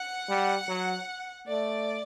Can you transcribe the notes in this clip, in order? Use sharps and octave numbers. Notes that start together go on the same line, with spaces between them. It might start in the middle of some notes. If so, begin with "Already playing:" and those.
Already playing: F#5
G3
F#3
A3 D5